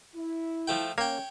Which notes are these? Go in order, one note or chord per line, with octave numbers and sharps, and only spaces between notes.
E4
F3 A3 G5
A#3 C#4 C#5 G5